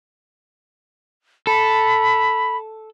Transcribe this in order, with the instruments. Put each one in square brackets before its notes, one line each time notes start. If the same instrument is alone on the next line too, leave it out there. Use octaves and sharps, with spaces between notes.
[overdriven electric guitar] A4 [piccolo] B5